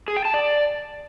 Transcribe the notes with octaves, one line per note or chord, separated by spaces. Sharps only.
G#4
G5
A5
D5